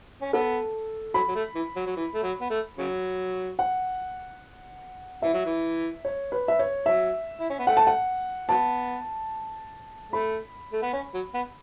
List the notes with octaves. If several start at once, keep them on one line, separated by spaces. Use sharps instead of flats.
C#4
B3 A4
F#3 B5
F#3
A3
E3
F#3
F#3
E3
A3
F#3
B3
A3
C#3 F#3
F#5
E3 E5
F#3
E3
C#5
B4
E5
C#5
F#3 E5
E4
C#4
B3
A3 F#5
A5
F#5
F#3 B3 A5
A3 B5
A3
B3
C#4
F#3
B3